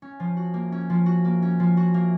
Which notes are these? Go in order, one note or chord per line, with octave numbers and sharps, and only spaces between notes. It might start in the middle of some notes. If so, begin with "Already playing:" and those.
C#4
F3
F#4
A#3
C#4
F3
F#4
A#3
C#4
F3
F#4
A#3